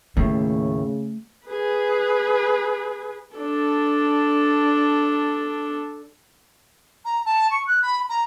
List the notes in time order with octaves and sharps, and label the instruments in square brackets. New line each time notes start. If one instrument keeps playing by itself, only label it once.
[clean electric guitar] D#2 A2 [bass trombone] C#3 [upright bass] A3
[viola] G#4 B4
[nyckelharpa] D4 A4
[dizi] A#5
A5
C#6
F#6
B5
A#5